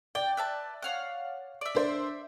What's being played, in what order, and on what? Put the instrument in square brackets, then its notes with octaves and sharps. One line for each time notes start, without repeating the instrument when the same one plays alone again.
[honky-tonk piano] D5 [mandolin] G5
[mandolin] B4 E5 A5
C#5 F5 F#5
D5 E5
[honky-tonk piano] D4 C5